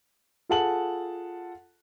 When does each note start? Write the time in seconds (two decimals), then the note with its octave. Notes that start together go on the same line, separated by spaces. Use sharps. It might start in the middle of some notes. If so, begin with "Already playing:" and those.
0.49 F4 G#4 A4 F#5 A5 F#7